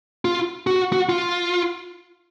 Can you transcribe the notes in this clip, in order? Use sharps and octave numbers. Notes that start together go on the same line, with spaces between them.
F4
F#4
F#4
F4